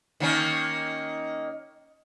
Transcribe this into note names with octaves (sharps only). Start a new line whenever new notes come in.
D#3 A#3 C#4